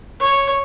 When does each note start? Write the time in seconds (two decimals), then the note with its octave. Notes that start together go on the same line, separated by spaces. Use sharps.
0.20 C#5